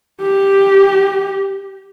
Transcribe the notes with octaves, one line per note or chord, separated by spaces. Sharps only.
G4